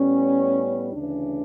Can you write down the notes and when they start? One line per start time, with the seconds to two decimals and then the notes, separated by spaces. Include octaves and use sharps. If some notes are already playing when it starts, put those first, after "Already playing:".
Already playing: A2 G3 B3 C#4
0.93 D2 C#3 E3 D4